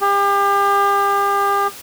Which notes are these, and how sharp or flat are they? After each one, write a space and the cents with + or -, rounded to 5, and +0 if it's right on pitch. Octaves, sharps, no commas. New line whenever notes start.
G4 +35